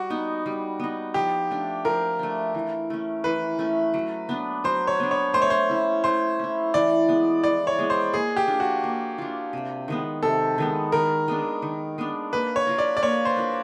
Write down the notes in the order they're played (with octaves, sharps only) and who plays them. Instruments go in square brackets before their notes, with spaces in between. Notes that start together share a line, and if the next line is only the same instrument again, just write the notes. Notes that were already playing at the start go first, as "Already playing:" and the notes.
Already playing: [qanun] G3 [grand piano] F#4
[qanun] B3 D#4
G3
B3 D#4
[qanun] F3 [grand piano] G4
[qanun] A3 D4
[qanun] F3 [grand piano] A#4
[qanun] A3 D4
E3
A3 C#4
[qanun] E3 [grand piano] B4
[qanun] A3 C#4
F#3
B3 D4
[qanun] F#3 [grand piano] C5
[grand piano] C#5
[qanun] B3 D4
[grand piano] C#5
[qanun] A3 [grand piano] C5
[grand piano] C#5
C5
[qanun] C#4 E4
[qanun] A3 [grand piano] C5
[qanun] C#4 E4
[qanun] E3 [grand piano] D5
[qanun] G#3 B3
[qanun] E3 [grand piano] D5
[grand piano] C#5
[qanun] G#3 B3
[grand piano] C5
[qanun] A#3 [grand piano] G#4
[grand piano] G4
[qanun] D4 F4
[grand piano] F#4
[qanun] A#3
D4 F4
C3
D#3 G#3 B3
[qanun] C3 [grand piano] A4
[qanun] D#3 G#3 B3
[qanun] D#3 [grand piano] A#4
[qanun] G#3 B3 D4
D#3
G#3 B3 D4
[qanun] A#3 [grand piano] B4
[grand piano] C#5
[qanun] D4 F4 A#4
[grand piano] D5
D5
[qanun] A#3 [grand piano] C#5
[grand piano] C5
[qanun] D4 F4 A#4